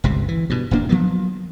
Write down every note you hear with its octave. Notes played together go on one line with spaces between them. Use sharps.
G1 C#2 C3
E3
G2 B2
D#1 G2 A#3 D4
F3 F#3 A#3 B3